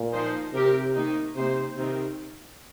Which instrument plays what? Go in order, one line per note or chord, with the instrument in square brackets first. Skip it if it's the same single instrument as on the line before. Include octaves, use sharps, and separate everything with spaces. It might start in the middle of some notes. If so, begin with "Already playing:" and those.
Already playing: [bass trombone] A#2
[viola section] F3 D#4 C5
[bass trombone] C3 [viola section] C4 G4 A#4
[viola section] D#3 A#3 D#4
[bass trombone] C3 [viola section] A#3 D#4 C5
[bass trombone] C3 [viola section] D#3 C4 D#4 A#4